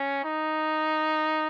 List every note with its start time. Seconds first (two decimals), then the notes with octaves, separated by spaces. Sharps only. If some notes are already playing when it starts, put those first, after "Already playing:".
Already playing: C#4
0.24 D#4